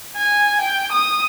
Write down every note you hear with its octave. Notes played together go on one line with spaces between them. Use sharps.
G#5
G5
D#6